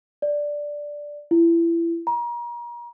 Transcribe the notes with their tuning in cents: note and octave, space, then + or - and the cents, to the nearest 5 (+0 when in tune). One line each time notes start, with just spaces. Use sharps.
D5 +0
E4 +30
A#5 +35